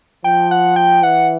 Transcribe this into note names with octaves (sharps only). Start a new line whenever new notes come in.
F3 G5
F#5
G5
E3 F#5